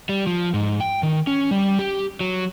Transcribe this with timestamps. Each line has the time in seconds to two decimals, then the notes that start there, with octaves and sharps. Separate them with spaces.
0.09 G3
0.27 F3
0.54 G#2
0.80 G5
1.03 D#3
1.27 C#4
1.51 G3
1.79 G4
2.20 F#3